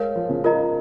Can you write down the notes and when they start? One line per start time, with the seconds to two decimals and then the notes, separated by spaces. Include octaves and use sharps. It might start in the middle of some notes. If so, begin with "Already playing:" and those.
Already playing: G#3 A#4 C#5 F5
0.16 F3
0.29 C#3
0.44 F4 A#4 D#5 A#5